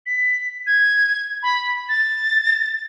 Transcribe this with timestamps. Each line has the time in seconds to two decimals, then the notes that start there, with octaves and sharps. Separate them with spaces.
0.06 B6
0.67 G#6
1.43 B5
1.89 A6